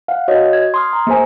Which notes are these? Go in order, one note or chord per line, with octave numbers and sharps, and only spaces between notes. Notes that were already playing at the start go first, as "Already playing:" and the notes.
F5 F#5
F#4 C#5 D#5
G#6
C6 D#6 F6
A#5
A#3 G#4 C5 G#5